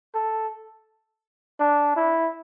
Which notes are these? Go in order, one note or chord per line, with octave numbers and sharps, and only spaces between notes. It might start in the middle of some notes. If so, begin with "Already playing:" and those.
A4
D4
E4